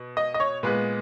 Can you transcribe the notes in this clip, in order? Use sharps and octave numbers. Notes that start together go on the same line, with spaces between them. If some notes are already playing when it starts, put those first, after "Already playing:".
Already playing: B2
D#5
D#5
C#5
A#2 G#3 B3 B4